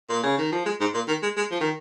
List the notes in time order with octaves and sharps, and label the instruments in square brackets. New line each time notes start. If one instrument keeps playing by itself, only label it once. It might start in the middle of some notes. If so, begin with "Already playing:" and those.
[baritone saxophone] A#2
C#3
D#3
F3
G#3
G#2
A#2
D#3
G#3
G#3
F3
D#3